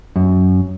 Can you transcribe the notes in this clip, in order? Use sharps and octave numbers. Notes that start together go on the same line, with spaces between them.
F#2